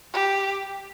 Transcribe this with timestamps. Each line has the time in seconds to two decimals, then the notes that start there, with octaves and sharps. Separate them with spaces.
0.13 G4